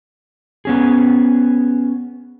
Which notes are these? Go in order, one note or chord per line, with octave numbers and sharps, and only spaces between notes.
B3 C#4 G#4